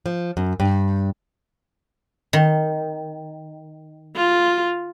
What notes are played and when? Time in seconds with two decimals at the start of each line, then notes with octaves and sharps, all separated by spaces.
0.06 F3
0.37 F#2
0.60 G2
2.33 D#3
4.16 F4